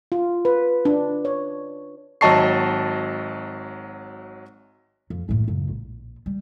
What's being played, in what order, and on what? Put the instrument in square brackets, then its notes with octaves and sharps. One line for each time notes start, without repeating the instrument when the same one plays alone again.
[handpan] F4
B4
D4
C#5
[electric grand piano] G#1 F#3 D#5 A5 C#6 C7
[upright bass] F2
F#2 A2
C#2 F#2
A#1
G3